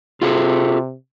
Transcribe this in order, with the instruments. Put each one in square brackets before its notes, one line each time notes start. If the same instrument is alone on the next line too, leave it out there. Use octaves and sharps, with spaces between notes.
[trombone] C3 [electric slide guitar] F4 G#4 A4